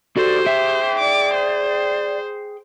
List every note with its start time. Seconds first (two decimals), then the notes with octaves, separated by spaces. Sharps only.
0.17 D2 F#4 G4 A4 C5 D5
0.47 G#4 E5 G5
0.99 D5 D6
1.34 C5